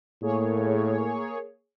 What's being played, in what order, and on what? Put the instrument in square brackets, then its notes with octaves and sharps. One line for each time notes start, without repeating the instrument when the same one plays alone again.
[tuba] A2 [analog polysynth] A#3 G#4 C#5